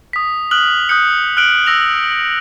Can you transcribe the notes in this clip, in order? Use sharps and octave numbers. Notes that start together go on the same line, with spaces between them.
D#6 B6
D#6 F6 F#6 F#7
D#6 F#6 G6 C#7
F6 F#6 D7 F#7
E6 A#6 F7